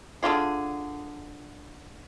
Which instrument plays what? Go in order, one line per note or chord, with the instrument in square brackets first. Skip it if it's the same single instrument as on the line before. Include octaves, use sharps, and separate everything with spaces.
[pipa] D3 D4 F4 G#4